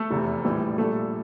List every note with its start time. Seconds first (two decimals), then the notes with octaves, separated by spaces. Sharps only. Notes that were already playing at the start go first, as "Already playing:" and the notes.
Already playing: A3 A4
0.11 F1 E2 C3
0.44 A#1 A2 E3 G3
0.77 A#1 A#2 G3 A3 A4